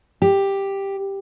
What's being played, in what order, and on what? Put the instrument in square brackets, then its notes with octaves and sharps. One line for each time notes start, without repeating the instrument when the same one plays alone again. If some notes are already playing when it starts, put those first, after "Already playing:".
[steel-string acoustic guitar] G4